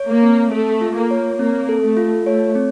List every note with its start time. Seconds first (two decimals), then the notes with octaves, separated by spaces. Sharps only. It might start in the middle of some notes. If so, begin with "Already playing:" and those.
Already playing: C#5
0.09 A#3
0.23 C4
0.52 A3 A4
0.81 F4
0.96 A#3
1.11 C#5
1.39 A#3 C4
1.69 A4
1.82 A3
1.97 F4
2.26 A3 C#5
2.55 C4